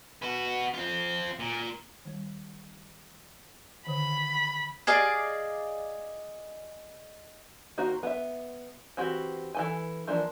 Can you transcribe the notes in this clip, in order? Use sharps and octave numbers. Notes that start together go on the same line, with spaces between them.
B3 F#4
C4 F4
A#2
D#3 G3
D3 D#3 B5
G#4 D5 D#5 F5
D#3 A#3 F#4 C5
B3 E5
E3 C4 F#4 G4
E3 A4 G#5
E3 F3 A#3 D4